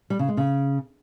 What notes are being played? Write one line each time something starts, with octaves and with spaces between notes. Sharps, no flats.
G3
C#3
G#3
C#3